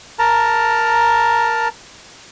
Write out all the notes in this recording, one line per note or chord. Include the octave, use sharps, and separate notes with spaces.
A#4 A5 A#5